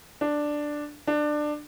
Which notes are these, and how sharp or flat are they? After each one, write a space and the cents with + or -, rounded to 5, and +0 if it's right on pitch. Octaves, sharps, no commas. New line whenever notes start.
D4 +5
D4 +20